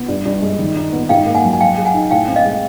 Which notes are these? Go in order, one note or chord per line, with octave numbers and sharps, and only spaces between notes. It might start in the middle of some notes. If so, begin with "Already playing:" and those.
Already playing: B3
G2
G2
G#3
D#3
D#4
B3
G#2 F5 G5
A#3
F#5 G#5
F#3
G#5
F#3 F5 G5
G#4
F#5 G#5
D#4
A2 F5 G5
C4
D#5 F5
G#3